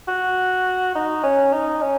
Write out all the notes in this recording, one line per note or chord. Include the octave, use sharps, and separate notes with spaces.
F#4
D#4
C#4
D#4
C#4